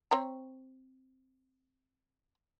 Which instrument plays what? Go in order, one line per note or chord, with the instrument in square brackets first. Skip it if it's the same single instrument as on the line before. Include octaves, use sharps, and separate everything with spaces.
[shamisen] C4 C#5 A#5